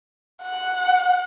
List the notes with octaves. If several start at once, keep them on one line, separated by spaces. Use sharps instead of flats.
F#5